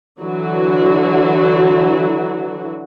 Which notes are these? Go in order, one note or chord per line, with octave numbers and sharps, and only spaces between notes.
D3 E3 F#3 F#4